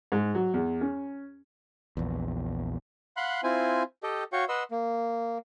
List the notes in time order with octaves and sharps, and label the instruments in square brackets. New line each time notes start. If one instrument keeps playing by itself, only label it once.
[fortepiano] G#2
F#3
E2
C#4
[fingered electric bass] A#1 E2
[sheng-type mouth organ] F5 F#5 B5 C6 F#6
C4 E4 F4 C5 G#5
G4 A4 D#5 G5
F#4 C#5 F5 G5 C#6
B4 D#5 F#5 C6 E6
A#3